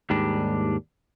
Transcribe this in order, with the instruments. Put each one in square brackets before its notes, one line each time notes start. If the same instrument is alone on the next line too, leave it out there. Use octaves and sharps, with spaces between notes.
[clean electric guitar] D#2 G#2 G3 D4